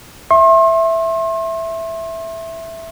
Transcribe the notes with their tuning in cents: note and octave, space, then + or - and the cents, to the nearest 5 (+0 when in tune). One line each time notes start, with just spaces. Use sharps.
E5 +0 C6 +40